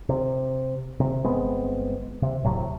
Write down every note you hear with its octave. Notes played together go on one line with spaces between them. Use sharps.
C3
C3
G1 G#3 B3 C4
C3
D1 A2 C3 F#3